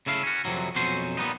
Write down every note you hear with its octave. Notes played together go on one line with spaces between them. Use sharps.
C#3 A3 E4 F5
C#4 F#4
F2 C3 E3 F#3
F2 B2 F#3 C#4 C5
A#2 G3 B3 D#4